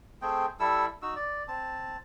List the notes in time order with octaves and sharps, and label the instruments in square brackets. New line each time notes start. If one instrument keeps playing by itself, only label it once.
[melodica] A3 C4 G#4 G5
G3 E4 A4 E6
D#4 F#4 E6
D5
C4 A5